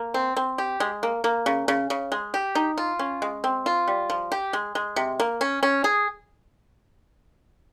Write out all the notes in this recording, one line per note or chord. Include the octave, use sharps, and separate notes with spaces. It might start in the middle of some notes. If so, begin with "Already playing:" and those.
Already playing: A#3
C4
C4
G4
G#3
A#3
A#3
C#3
C#3
C#3
G#3
G4
D#4
F4
C#4
G#3
C4
F4
G3
F3
G4
G#3
G#3
C3
A#3
C#4
C#4
G#4